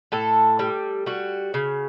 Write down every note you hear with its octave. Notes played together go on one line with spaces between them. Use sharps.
A2 A4
G3
G3 F#4
C#3